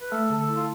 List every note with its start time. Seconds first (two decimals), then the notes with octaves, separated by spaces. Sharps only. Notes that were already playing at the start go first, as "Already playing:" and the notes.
0.01 B4
0.11 A3 A4
0.30 D3
0.39 A4
0.48 E4
0.55 F4